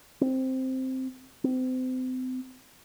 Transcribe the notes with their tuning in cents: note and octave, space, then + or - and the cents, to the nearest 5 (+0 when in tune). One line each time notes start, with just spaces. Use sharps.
C4 +0
C4 -35